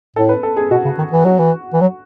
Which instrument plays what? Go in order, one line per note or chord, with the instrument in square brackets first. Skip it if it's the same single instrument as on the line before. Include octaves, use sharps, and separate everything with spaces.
[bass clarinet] A2 [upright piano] A4
[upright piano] B4
A4
G#4
[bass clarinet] B2 [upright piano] F#4
[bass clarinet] C#3
D#3
E3
[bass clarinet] F#3 [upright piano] F#4
[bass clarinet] E3
E3
F#3